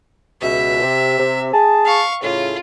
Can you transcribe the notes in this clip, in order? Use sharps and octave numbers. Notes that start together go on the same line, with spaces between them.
C#2 B2 E5
C3
C3
G#4 A5
F5 C#6
A2 C#3 C#4 F4